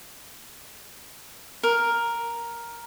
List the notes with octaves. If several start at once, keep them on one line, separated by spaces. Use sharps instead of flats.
A#4